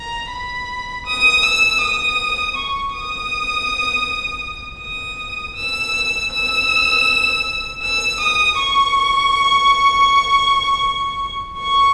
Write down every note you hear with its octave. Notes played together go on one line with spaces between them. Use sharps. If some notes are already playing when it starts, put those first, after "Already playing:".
Already playing: A#5
B5
D#6
E6
D#6
C#6
D#6
D#6
E6
E6
E6
D#6
C#6
C#6